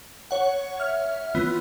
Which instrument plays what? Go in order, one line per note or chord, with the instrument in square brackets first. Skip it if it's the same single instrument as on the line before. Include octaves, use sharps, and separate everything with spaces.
[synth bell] C#5 F#5
[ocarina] E5 [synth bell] F6
[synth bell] E3 B3 [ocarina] F4